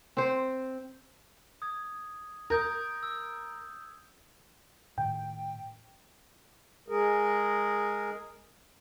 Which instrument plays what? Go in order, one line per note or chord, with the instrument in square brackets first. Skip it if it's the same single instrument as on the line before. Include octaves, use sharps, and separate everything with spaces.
[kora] C4 C5
[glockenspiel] D#6 G#6
[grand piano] A#4 [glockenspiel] D#6 G6 G#6
[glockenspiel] E6
[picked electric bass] A2 D#3 [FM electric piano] G5
[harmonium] G#3 G#4 A#4